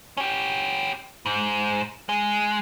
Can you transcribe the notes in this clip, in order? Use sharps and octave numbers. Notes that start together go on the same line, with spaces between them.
C#4 G4
G#2
G#3